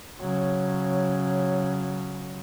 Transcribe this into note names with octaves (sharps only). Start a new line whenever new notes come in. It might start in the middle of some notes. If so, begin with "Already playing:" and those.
C#3 F#3